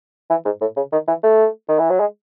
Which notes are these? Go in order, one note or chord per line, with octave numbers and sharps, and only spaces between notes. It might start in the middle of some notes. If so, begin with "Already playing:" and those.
E3
G#2
A2
C#3
D#3
E3
A3
D#3
E3
F#3
G#3